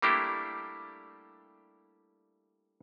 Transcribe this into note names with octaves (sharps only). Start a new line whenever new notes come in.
G3 A3 A#3 D4 E4 G4